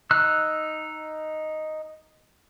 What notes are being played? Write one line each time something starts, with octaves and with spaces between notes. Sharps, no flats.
D#4 E6 F#6